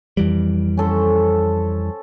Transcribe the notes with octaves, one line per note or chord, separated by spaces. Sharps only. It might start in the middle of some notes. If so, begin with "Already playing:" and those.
F2 E3 G3
C#4 A4 C5